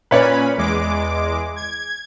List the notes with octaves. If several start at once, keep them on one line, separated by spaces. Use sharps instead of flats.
A#2 C#4 B4 C#5 D5 B5
E2 G#3 D6
G#6